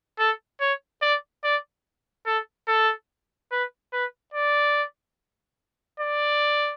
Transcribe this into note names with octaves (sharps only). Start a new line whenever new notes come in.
A4
C#5
D5
D5
A4
A4
B4
B4
D5
D5